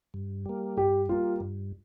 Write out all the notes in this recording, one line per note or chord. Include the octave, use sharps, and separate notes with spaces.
G2
G3 A#3
G2 G4
G3 A#3 F4
G2